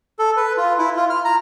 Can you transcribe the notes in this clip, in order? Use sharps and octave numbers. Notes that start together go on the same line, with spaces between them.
A4
B4
F4
E4
F4
F6
A#5